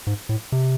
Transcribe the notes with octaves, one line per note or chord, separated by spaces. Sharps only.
G#2
A2
C3